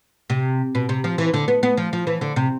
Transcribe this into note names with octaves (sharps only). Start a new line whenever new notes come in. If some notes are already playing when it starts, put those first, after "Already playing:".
C3
B2
C3
F3
E3
D3
B3
B3
F3
F3
E3
D3
C3